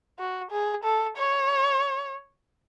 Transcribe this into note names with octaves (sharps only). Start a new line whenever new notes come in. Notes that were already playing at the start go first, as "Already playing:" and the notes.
F#4
G#4
A4
C#5